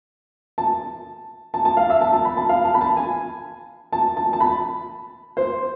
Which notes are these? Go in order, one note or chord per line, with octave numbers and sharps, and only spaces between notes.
A5
A5
A5
F5
E5
A5
A5
B5
A5
F5
A5
B5
A5
G#5
A5
A5
A5
B5
C5